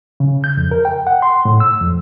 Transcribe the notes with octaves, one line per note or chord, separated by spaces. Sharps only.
C#3
G6
F2
A#4
G5
F#5
C6
A2
E6
F2